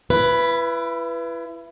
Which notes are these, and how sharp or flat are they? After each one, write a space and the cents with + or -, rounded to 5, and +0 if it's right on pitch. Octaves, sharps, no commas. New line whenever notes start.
E4 +35 B4 +0